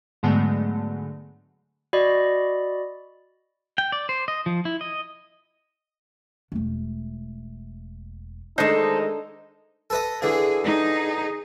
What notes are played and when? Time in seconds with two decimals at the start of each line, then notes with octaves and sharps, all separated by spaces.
0.23 G#2 D3 F#3 G#3 A3 B3
1.93 F#4 D5 D#5 B5
3.78 G5
3.92 D5
4.09 C5
4.28 D#5
4.46 F3
4.65 E4
4.81 D#5
6.52 E1 A3
8.58 D#3 G#3 A3 D4 D#4 A4 C5 D#5
9.90 A4 B4 D#5
10.22 D3 E3 G#4
10.65 D#4 G#4